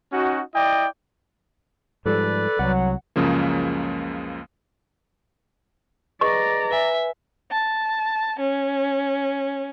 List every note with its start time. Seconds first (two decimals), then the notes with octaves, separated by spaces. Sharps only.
0.12 C#4 D#4 F#4
0.53 E4 D5 D#5 G5
2.06 G#2 F3 G3 A4 B4 D5
2.59 C2 F#3 F#5
3.16 C#2 F#2 C#3 F3 A#3
6.21 G#4 B4 D5 D#5 A#5 C#6
6.71 B4 E5 G#5
7.52 A5
8.40 C#4